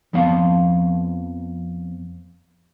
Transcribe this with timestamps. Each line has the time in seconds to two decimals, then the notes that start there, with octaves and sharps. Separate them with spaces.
0.13 F2 F3 B3 F5 A5